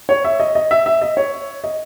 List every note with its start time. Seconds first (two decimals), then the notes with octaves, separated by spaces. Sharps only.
0.09 C#5
0.25 E5
0.40 D#5
0.55 D#5
0.71 E5
0.86 E5
1.02 D#5
1.17 C#5
1.64 D#5